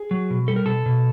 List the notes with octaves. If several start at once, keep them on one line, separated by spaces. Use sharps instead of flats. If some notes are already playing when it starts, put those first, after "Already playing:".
Already playing: G#4
F#3
B2
G3 A4
A#4
B2 A4
B2